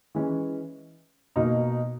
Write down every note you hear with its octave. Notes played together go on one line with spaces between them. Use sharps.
E3 G#3 C#4
B2 A#3 D#4